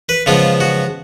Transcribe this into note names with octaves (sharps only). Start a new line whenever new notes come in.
B4
C#3 F3 G#3 B3 F4
F#4